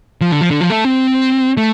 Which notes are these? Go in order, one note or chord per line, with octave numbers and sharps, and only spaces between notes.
F3
D3
F3
D3
F3
A3
C4
A3